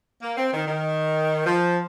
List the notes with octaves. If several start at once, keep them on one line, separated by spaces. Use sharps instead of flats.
A#3
C4
D#3
D#3
F3